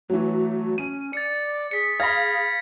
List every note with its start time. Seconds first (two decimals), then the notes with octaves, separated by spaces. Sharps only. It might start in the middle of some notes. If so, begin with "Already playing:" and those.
0.10 E3 F#3 A3
0.78 C#4 D#7
1.13 D5 A6 C#7
1.71 G#4 B6 C#7
2.00 F5 B5 G#6 A#6 B6